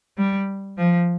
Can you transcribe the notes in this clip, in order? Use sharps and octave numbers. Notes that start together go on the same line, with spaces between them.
G3
F3